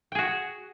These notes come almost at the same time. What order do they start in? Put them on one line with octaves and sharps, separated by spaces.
G5 G#4 F#4